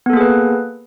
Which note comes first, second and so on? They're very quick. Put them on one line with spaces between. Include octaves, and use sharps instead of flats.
B3 A4 A#3 G#4 B4